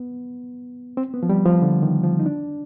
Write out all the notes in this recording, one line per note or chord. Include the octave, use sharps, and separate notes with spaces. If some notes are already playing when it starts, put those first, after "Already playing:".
Already playing: B3
C4
B3
F3
G3
F3
D3
D#3
F3
D#4
D4